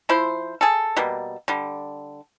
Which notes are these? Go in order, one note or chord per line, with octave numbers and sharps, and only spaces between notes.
F3 E4 C5
G#4 A4
B2 G3 A#3
D3 G3